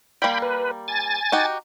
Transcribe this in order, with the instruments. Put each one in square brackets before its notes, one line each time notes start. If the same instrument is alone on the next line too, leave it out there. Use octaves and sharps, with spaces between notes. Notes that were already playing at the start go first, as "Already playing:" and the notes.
[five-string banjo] G3 A#3 [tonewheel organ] G5 B5
[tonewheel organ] B4
G#5 A6
[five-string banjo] D#4 F#4 G4